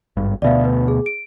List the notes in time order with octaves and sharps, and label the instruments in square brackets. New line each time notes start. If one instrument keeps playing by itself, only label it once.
[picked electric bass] G#1 G2
[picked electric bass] D2 B2 [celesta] D5 E5 F5
[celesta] B4
G#4
D7